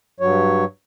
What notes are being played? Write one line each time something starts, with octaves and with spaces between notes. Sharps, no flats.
G2 F#3 C#5